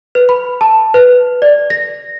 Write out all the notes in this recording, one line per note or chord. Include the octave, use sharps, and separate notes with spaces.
B4
B5
A5
B4
D5
A#6